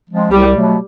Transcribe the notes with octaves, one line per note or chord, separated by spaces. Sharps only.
F3 G#3 C4
C2 G3
B2 F#3 A3